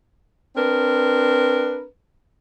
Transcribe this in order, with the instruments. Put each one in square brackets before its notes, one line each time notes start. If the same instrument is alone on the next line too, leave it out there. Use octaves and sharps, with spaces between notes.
[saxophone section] C4 D4 A#4 B4